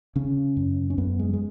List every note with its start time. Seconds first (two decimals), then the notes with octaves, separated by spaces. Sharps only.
0.16 C#3 C#4
0.57 F#2
0.90 C#4
0.98 F#2 B3
1.19 G#3
1.34 G#3